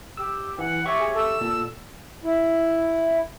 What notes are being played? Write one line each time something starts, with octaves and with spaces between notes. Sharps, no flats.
G4 E6
E3 F#5
G4 C#5 E5 C#6
G#4
A4 E6
A#2
E4